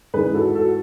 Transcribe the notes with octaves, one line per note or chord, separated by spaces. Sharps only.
G#2 E3 G#4 B4
F#4 A4
F#4 A4